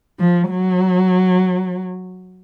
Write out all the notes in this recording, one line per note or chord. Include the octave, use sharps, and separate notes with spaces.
F3
F#3